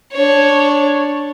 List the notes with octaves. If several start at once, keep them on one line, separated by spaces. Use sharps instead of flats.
D4 C#5